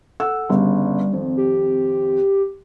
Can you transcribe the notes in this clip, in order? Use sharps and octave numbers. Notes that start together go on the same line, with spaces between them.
A4 F#5 E6
G1 C#3 G3
G#1 F2
G4